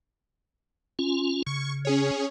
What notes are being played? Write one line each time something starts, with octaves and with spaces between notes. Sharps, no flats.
C#4 F4
C#3 C#6
C#4 G#4 C#5